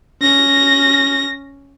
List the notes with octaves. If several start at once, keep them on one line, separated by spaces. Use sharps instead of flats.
C#4 A#6